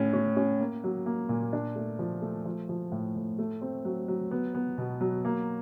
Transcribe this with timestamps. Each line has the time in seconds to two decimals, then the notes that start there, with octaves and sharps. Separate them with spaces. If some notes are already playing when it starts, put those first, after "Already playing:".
Already playing: A2 C#4
0.13 C#4
0.37 C#4
0.60 A#3
0.84 F#3
1.06 A#3
1.29 A#2
1.53 D4
1.76 A3
1.99 F3
2.22 A3
2.46 F3
2.69 F3
2.92 A2
3.16 A2
3.39 A3
3.62 C4
3.85 F#3
4.08 F#3
4.31 B3
4.54 B3
4.78 B2
5.01 F#3
5.25 A#3